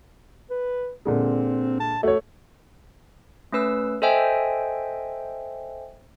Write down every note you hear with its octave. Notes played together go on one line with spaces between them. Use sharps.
B4
A#2 D3 G#3 C4
A5
A3 F#4 C#5
A3 C#4 B4 E6
A4 C5 D#5 E5 G5 G#5